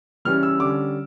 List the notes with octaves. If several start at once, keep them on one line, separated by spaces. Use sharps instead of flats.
C#3 E3 G3 C#4 F6
E6
D3 G3 C#4 D6